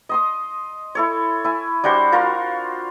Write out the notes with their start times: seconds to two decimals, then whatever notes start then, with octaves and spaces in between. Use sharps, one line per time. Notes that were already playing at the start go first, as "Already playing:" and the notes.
0.09 D#5 C6 D#6
0.95 E4 A4 C#5
1.44 E4 G#5
1.84 G3 D4 F#4 C5
2.12 F4 F#4 A#4 F5